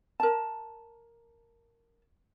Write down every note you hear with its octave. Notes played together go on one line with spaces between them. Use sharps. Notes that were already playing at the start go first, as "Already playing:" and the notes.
A#4 A5